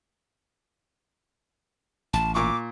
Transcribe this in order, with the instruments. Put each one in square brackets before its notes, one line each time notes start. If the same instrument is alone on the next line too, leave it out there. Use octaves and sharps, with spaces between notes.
[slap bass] A1 [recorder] A5
[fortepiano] A#2 C#6 [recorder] D6